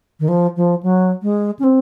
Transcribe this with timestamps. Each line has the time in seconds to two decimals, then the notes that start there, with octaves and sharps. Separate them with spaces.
0.20 D#3
0.28 F3
0.56 F3
0.83 F#3
1.23 G#3
1.59 C#4
1.64 C4